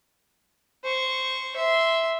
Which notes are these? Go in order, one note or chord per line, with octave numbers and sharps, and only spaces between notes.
C5 C#6
E5 C6